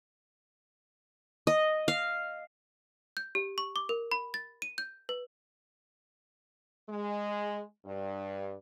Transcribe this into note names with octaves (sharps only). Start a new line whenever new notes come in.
D#5
F5
G6
G4
C#6
D6
A#4
B5
A6
D#7
G6
B4
G#3
G2